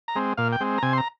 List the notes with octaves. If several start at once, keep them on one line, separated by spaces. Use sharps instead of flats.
A#5
G#3 C4
A#2 F5
G5
G#3 C4
A#5
C3 G#5
C6
A#5